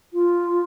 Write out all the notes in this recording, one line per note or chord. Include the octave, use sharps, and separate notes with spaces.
F4